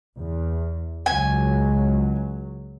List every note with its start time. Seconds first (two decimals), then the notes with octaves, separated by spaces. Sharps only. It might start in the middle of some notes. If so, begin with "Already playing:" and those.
0.18 E2
1.06 C#2 F#3 G#5